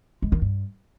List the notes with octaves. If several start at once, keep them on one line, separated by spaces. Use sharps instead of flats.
G#3
D#3
G2